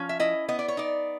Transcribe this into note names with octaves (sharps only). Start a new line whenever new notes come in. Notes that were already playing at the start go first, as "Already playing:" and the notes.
Already playing: F3 C#4
E5
E4 D#5
B3 D#5
D5
C#5
D#4 D5